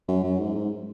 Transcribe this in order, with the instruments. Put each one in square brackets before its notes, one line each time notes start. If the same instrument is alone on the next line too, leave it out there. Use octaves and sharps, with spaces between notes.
[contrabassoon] F#2
F#2
G#2
G#2